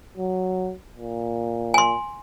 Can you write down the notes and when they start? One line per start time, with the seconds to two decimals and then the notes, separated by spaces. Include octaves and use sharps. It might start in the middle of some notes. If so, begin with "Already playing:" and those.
0.17 F#3
0.97 A#2
1.74 G#5 C6